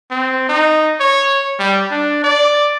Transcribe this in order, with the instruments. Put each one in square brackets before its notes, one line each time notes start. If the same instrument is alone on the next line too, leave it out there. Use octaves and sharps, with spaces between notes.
[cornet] C4
D#4
C#5
G3
D4
D5